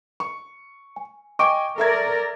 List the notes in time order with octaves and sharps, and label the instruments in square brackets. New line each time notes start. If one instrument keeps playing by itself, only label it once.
[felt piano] C#6
[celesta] G#5
[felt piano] D#5 G5 G#5 [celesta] C#6 D6 D7
[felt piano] A4 E5 G#6 [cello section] A#4 D5